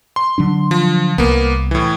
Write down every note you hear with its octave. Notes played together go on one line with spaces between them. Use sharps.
C6
D3 F#3 D4
F3
C2 A#3 B3
A2 E3